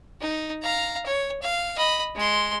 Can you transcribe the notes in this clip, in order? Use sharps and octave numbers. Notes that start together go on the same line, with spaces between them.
D#4
F5 A#5
C#5
F5
D#5 B5
G#3 C6